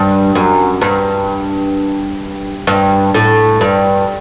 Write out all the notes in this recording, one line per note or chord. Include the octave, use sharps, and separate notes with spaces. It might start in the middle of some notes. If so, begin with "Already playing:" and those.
Already playing: G2
F#2
G2
G2
A2
G2